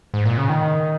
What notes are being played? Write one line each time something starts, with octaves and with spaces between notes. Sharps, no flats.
G#2
A#2
C#3
D#3